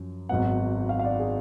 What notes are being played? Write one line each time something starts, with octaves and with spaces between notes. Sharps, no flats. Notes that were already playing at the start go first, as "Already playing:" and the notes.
Already playing: F#2 F3
G#1 G#2 F#3 B3 F#5
F5
F5
D5
G#4